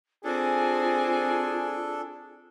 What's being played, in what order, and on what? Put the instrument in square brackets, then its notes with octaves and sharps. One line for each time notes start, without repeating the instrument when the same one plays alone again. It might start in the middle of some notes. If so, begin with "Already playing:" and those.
[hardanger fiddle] C4 G#5 [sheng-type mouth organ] D4 A4 [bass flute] F4 [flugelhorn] G#4